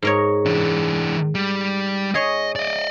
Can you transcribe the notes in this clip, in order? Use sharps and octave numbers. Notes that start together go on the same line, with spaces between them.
G#2 A#4 C#5
E3 D4
G3
G#4 C#5 D#5
D5 D#5